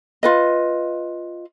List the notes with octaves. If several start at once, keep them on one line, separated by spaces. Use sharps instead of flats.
F4 B4 D#5